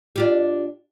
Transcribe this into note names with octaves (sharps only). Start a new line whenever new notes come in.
D4 F4 G4